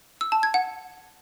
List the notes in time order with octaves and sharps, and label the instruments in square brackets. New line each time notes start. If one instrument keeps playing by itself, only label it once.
[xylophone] E6
A5
G#6
F#5